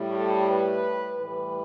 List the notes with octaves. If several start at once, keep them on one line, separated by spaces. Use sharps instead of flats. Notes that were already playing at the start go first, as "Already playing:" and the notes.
Already playing: A2 G3
A4
B4
A2 E3 G3 B4